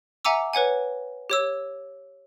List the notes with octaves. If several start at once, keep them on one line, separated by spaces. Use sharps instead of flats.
E5 F#5 G#5 A#5 D6 E6
B4 C#5 F#5 G#5
G4 C#5 E6